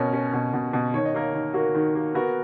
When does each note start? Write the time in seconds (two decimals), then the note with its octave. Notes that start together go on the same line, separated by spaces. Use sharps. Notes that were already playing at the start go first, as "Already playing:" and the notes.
Already playing: B2 C#4 A#4 C#5
0.13 C#4
0.34 B2
0.54 B2
0.73 B2
0.94 D#3 C#5
1.05 D#5
1.14 A#3 A#4 C#5
1.34 D#3
1.54 A#3 F#4 A#4
1.75 D#3
1.95 A#3
2.14 B3 F#4 A#4